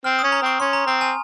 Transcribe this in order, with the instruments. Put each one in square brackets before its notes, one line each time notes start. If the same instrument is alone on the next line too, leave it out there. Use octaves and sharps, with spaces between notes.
[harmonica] C4 [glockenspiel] F6
[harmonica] C#4 [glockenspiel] D#6
[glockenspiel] A#5
[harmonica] C4 [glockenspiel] C#6
[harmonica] C#4 [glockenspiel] C6
[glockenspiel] A#5
[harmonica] C4 [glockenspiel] A#5
[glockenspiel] G#5